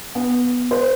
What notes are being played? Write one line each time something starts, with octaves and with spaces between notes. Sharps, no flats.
B3
C5